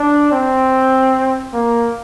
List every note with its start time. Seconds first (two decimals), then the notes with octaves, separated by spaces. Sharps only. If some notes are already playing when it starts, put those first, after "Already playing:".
Already playing: D4
0.32 C4
1.53 A#3